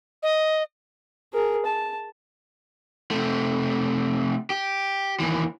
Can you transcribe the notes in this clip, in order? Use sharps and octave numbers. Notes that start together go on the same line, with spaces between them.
D#5
G#4 A#4
A5
C3 A3
G4
D#2 E3